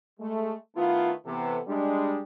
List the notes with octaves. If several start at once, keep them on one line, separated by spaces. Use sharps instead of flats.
G#3 A3
D#3 A3 B3 E4 F4
C3 E3 B3 A4
G3 G#3 D4